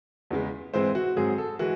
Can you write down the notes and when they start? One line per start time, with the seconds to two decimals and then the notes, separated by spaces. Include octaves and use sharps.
0.30 E2 C#3 G#3
0.74 G#2 E3 G#3 C4 C5
0.95 F#4
1.16 G#2 F#3 C4 G#4
1.38 A4
1.59 E3 G#3 F#4